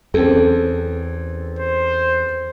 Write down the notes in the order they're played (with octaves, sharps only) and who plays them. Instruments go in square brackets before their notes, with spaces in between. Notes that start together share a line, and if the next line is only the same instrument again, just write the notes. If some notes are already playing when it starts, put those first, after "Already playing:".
[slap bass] E2 [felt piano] C4 C#4 A4
[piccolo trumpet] C5